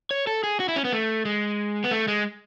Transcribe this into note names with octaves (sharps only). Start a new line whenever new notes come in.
C#5
A4
G#4
F#4
E4
C#4
B3
A3
G#3
B3
A3
G#3